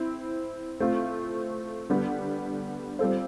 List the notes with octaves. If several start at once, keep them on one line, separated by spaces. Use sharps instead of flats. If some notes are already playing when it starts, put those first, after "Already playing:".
Already playing: C4 E4
A3 C4 F4
D3 G3 B3
G3 C4 F4 A4 C5